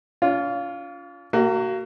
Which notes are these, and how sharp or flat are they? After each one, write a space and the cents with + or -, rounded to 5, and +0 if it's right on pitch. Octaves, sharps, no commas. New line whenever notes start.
C#4 +45 F4 +0
A#3 -30 F#4 +25